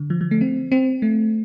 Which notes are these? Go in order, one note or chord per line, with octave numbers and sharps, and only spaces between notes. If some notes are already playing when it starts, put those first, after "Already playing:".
Already playing: D3
F3
F3
A3
C4
C4
A3